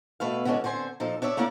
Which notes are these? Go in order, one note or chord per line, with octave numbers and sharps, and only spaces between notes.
B2 A3 B4 F5
D3 E3 G#3 A#3 C#4 D4
D3 C4 C5 G#5
A#2 F3 D#4 A4
D4 C#5 D5 E5
A3 A#3 C#4 E4 D5